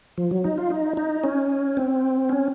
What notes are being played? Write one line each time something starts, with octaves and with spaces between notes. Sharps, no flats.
F3
F#3
D#4
F4
D#4
D#4
C#4
C4
C#4